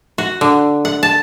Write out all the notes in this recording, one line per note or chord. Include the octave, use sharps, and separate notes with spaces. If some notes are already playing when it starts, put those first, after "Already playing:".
F#4
D3
F#5
A5